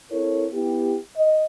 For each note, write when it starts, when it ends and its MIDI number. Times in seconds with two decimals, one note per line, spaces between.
0.12 0.45 60
0.12 0.45 64
0.12 0.45 69
0.12 0.45 70
0.12 0.45 73
0.53 0.96 59
0.53 0.96 64
0.53 0.96 67
1.16 1.44 75